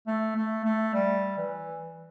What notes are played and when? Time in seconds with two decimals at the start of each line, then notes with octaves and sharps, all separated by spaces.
0.07 A3
0.36 A3
0.65 A3
0.94 G3
1.38 E3